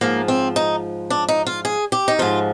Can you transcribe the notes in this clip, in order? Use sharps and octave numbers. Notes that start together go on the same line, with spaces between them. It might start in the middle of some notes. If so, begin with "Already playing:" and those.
G#2 F3 A#3
C4
D#4
D4
D#4
F4
G#4
G4
D#4
G#2 F3 F4